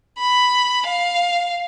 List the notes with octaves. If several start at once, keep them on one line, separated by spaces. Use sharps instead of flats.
B5
F5